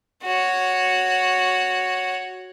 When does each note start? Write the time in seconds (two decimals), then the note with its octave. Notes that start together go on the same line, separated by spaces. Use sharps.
0.23 F#4 C#5